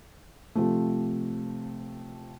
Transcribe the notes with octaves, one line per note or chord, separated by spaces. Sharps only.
C3 F3 A3